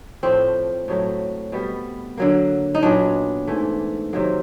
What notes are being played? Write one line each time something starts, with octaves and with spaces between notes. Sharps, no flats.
A2 F3 A3 C4
A2 F#3 A3
B2 G3 B3
D3 F#3 A#3
D#4
A#2 F#3 B3 D4
G#2 E3 A3
C3 D#3 F#3 A#3